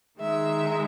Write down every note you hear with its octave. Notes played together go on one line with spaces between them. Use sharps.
D#3 G#3 D#4 E5